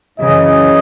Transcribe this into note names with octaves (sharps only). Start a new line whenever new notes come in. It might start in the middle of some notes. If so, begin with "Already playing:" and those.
F#2 C#3 E3 D#5